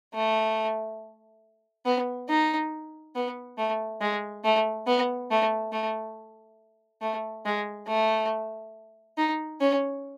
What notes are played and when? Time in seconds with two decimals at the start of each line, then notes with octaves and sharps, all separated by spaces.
0.14 A3
1.85 B3
2.29 D#4
3.15 B3
3.58 A3
4.01 G#3
4.44 A3
4.86 B3
5.31 A3
5.72 A3
7.02 A3
7.46 G#3
7.88 A3
9.17 D#4
9.60 C#4